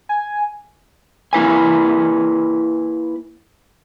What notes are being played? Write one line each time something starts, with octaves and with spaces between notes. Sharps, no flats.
G#5
A#3 E4 B4 G#5